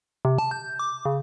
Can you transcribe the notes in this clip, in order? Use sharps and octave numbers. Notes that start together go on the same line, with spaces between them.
C3
A5
G6
D6
C#3